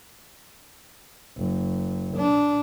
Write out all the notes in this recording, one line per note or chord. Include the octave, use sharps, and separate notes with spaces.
F#1
D4